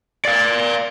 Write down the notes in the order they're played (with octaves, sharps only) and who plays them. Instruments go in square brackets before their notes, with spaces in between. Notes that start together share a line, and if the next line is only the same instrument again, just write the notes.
[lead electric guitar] D5 F5